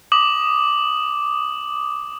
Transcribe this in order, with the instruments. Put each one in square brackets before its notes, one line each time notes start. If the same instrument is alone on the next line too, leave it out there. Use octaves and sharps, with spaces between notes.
[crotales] D6 D#6 F#7